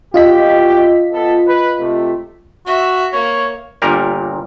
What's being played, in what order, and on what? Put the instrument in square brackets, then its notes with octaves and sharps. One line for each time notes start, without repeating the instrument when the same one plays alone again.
[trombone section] C2 B2 G4 [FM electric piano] F4 D#5 B6
[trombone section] B3 A4
B4
C3 A3
[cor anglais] F#4 [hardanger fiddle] E5
[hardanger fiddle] A#3 [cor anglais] C#5
[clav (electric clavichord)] G1 A#2 G3 A#4